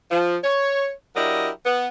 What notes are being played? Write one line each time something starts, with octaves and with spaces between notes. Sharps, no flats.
F3
C#5
F#3 D4 E4 G4 A#4 D#5
B3